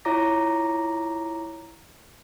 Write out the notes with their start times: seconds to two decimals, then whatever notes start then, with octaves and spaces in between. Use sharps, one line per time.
0.05 E4 F4 C#5 A#5 D6 A#6